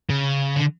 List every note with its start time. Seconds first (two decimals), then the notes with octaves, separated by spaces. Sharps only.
0.10 C#3
0.56 D3